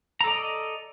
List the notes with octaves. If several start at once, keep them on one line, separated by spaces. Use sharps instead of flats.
A4 D5 D#5 A#5